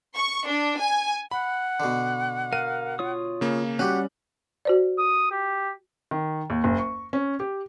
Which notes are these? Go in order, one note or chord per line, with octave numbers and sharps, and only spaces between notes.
C#6
D4
G#5
F#5 B5
B2 D3
A#4 F5 D#7
F4 C#5 D#6
C#3 A#3
G3 C#4 F#4 G4 F#5 F#6
F#4 C5 D5
D#6
G4
D#3
D#2
F#1
C#6
C#4
G4